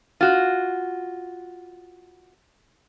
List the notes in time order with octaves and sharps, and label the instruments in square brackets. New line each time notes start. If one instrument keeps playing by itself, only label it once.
[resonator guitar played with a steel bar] F4 F#4